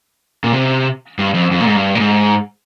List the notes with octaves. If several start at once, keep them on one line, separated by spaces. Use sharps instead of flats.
A#2
C3
G2
F2
F2
A#2
G#2
G2
A#2
G#2